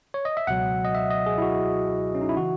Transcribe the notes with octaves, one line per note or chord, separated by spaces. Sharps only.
C#5
D#5
E5
C#2 B2 F#3 F#5
D#5
E5
D#5
G#4
E4
F#4
C#4
D#4
E4
C#3 E3 F#4